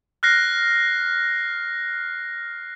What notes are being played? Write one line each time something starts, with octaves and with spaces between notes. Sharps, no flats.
F6 F#6 A#6 C7